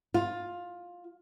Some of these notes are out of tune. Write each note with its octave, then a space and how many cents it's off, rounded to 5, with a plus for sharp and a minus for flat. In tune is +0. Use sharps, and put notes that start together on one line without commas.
F4 +15